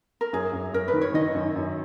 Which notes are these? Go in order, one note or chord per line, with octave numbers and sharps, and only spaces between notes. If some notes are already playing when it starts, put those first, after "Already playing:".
A#4
F#2 G#4
F#2
F#2 A#4
B4
D#3
C#5
D#3 D#5
F#2
F#2